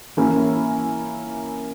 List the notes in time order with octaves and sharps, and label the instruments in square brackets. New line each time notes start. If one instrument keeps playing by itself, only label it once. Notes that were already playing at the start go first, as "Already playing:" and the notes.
[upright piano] E3 A#3 C#4 E4